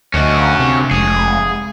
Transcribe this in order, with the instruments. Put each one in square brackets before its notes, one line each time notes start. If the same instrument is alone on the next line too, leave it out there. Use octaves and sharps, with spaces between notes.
[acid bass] D2 [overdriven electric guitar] C#4 F#4 [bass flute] D#5
[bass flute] F5
[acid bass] C3 [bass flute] D4
[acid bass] F1 [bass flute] G#3 [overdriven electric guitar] G#4